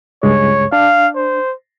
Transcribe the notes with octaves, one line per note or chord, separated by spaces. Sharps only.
C#2 G2 G#3 C#5
D4 F5
C5